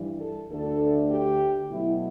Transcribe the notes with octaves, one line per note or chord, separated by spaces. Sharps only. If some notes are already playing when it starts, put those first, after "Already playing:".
Already playing: G2 E3 G3
A4
D2 D3 A3 A4
G4
B2 F#3 A3 E4